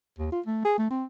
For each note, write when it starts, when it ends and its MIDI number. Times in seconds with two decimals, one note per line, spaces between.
0.19 0.31 39
0.32 0.41 65
0.46 0.60 57
0.65 0.76 68
0.78 0.89 57
0.90 1.04 60